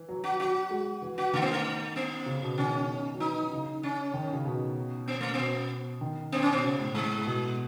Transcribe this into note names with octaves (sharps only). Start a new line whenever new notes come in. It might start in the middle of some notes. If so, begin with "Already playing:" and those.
Already playing: E3
F#3
F#4
F#4
G#3
E3
E3 F#4
D#3 A3
B3
A3
B3
C#3
B2
D#3 C#4
F#3
E3 D#4
C#3
C#4
D#3
C#3
B2
B3
A3
B3
B2
D#3
B3
C#4
B2 B3
C#3
A2
A2 G#3
B2